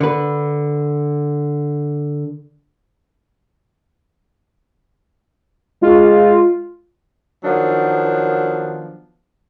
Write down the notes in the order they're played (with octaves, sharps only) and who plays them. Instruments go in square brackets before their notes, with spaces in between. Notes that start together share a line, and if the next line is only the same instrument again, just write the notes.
[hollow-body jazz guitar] D3 B4
[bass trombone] G#3 [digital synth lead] F4
[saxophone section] D#3 F3 F#3 B3 D4